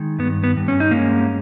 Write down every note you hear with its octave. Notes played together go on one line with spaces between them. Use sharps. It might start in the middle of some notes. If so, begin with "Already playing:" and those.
Already playing: D#3 G#3
G2 B3
B3
G2
C#4
D#4
G#3 A#3 C#4